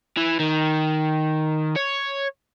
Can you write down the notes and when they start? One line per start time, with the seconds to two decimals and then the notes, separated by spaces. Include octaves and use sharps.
0.17 E3
0.40 D#3
1.76 C#5